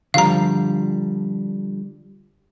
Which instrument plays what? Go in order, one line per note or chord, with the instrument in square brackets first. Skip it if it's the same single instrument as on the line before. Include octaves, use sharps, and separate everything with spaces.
[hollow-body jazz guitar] D3 F3 G3 [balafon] F5 A#5